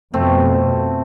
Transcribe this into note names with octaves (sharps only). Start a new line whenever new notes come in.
F2 B2 A3 C4